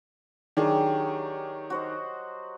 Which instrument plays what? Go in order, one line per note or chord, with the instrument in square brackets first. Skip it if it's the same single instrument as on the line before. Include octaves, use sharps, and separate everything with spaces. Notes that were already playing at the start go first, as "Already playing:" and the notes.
[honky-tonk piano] D#3 D4 G#4 [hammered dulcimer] F#3 G4
[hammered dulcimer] F#4 C5 D#5